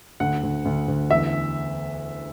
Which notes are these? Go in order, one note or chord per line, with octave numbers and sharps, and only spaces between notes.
D2 F#5
D2
D2
D2
E2 E5